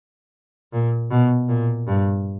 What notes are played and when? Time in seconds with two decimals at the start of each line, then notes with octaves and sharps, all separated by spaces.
0.73 A#2
1.11 B2
1.49 A#2
1.88 G2